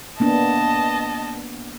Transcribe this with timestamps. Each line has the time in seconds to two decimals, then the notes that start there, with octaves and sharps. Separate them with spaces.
0.20 A#3 B3 D4 D#5 A5